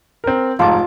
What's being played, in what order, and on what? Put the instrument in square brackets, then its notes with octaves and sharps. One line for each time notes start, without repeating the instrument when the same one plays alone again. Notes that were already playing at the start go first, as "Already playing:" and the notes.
[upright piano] C4 A#4
[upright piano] F1 G#2 [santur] F4 A5 D6